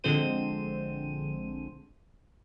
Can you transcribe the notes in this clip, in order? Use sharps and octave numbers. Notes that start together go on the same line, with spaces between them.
A#1 D3 G#3 C4 C5 D#7